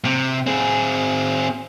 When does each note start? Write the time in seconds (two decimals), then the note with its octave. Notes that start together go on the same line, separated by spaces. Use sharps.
0.05 C3
0.47 C4 G#4